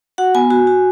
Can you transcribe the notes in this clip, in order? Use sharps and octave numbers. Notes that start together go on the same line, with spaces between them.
F#4 F#5
B3 G#5
F#4
F#4